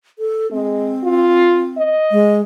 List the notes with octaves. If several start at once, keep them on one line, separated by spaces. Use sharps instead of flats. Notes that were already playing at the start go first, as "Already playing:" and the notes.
A4
G#3 C4
F4
D#5
G#3